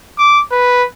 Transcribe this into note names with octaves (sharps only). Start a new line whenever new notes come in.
D6
B4